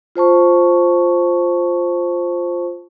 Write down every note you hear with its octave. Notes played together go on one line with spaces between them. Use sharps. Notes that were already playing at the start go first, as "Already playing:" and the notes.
F4 C5 A5 C#6